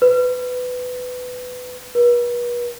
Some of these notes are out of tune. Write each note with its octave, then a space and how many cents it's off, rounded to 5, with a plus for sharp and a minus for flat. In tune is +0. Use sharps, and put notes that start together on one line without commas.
B4 +15
B4 -40